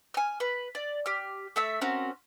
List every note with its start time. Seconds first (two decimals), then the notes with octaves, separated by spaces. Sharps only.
0.14 G#5 F6
0.40 B4
0.75 D5
1.06 G4 F6
1.56 A3 E5 E6
1.81 C4 C#4 F#4 A#4